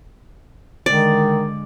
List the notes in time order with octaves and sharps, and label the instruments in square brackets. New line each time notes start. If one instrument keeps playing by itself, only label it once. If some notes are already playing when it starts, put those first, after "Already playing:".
[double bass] D3 G#3 [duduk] D#3 [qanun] D5